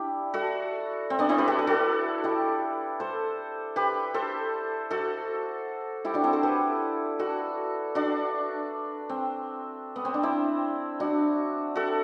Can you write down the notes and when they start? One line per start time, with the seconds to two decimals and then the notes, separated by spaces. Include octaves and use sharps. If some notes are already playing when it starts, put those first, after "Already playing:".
Already playing: D4 E4 G4
0.34 F#4 A4
1.10 C4
1.19 B3 D4
1.29 C4 E4
1.38 G4 B4
1.48 F#4 A4
1.59 B4
1.67 F#4 A4
2.24 E4 G4
3.00 A4 C5
3.76 G4 B4
4.14 A4 C5
4.91 F#4 A4
6.05 E4 G4
6.14 D4 F#4
6.24 C4 E4
6.33 A4 C5
6.43 G4 B4
7.19 F#4 A4
7.95 D4 F#4
9.09 C4
9.96 B3
10.05 C4
10.14 D4
10.23 C4 E4
11.00 D4 F#4
11.76 F#4 A4